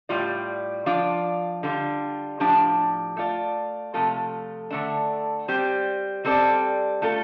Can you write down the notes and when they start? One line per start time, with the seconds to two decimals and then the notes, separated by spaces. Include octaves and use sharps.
0.09 A2 G3 F4 D5
0.86 F3 D4 F4 D5
1.63 D3 G3 F4
2.40 A2 F3 D4 G4
3.17 A3 F4 D5
3.94 C3 F3 A3 F4 A4
4.71 D3 A3 D4
5.48 G3 C4 G4 C5
6.25 G3 C4 A4 D5
7.02 A3 F4 A4